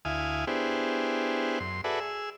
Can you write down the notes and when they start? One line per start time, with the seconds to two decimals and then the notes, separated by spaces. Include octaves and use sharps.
0.05 D2 E4 F5 G#5 D#6
0.47 B3 D4 E4 G4 G#4 C5
1.60 F#2 C6
1.84 F#4 G#4 A4 B4 D5 E5
2.00 G#4 E6